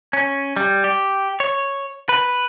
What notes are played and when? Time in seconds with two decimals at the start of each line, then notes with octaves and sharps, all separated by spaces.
0.13 C#4
0.56 G3
0.84 G4
1.40 C#5
2.09 B4